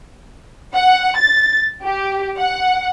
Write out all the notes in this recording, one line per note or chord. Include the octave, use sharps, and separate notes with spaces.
F#5
A6
G4
F#5